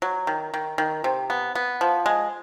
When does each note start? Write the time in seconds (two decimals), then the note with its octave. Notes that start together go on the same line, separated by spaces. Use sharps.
0.02 F#3
0.27 D#3
0.54 D#3
0.78 D#3
1.04 C3
1.30 B3
1.55 B3
1.81 F3
2.06 G#3